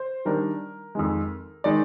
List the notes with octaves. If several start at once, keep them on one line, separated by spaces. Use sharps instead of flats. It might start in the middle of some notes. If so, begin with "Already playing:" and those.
Already playing: C5
D#3 G3 D4 A#4
F2 D#3 G#3
D#3 G#3 D#4 D5